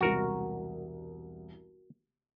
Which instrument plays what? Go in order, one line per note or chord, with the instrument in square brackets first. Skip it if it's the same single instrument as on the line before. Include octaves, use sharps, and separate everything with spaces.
[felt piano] E1 C2 [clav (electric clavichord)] F#4 A#4